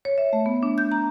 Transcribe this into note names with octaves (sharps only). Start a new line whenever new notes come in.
C#5
E5
A3
B3
D4
G6
A#5